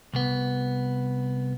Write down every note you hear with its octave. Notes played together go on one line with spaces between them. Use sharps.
C2 B3